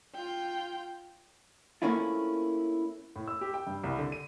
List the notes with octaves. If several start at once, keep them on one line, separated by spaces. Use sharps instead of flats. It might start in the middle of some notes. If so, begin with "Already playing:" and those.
F4 G5
A3 A#3 C4 C#4 E4 F4
A2
E6
G4
G5
G2
C2
D3
D#7